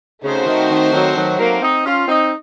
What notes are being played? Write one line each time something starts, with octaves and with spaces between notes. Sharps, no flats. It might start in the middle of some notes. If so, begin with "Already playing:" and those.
C#3 A3 C4 D#4 F#4 C5
D#3
D#3
D#3 F#3
D#3 F#3
F#3 A#3
C4 D#4
C#4 F4
C4 D#4